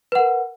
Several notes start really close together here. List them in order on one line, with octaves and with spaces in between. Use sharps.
B4 F#5 A#4